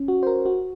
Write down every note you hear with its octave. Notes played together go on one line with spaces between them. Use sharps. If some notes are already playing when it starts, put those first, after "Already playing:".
Already playing: C#4
F#4
C5
A#4
F#4